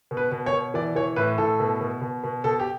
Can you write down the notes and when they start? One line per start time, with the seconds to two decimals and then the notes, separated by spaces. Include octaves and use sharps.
0.11 B2
0.17 B4
0.32 B2
0.46 C#5
0.53 B2
0.74 E3 D5
0.96 E3 C#5
1.16 A2 B4
1.38 A2 A4
1.60 B2
1.81 B2
2.02 B2
2.24 B2
2.44 B2 A4
2.59 G4